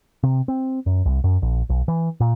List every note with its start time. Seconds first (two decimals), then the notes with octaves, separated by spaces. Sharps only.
0.23 C3
0.48 C4
0.86 F#2
1.06 C2
1.24 F#2
1.42 A#1
1.69 B1
1.88 E3
2.20 A#2